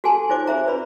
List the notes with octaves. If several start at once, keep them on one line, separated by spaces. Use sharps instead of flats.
F#4 G#4 A4 G#5 A5 C6
D#4 F4 C5 C#5 D6
G#4 C5 E5 A#5
B4 D5 B5